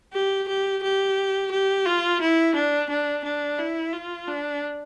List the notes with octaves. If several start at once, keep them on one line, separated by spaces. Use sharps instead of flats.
G4
G4
G4
G4
F4
E4
D4
D4
D4
E4
F4
D4